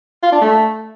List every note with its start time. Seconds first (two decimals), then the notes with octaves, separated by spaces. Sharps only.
0.23 F4
0.32 D4
0.41 A3